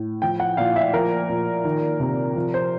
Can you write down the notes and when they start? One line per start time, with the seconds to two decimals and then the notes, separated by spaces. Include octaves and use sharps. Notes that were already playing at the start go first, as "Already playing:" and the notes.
Already playing: A2
0.22 F3 G5
0.40 F#5
0.57 A#2 F5
0.76 E5
0.94 F3 A#4
1.29 A#2
1.64 D#3
2.00 C3
2.36 F3
2.54 C5